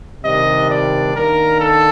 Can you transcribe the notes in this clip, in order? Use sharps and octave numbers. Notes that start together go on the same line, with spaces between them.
C3 D#3 G3 D4 D#5
D5
D#3 A#3 D4 A#4
A4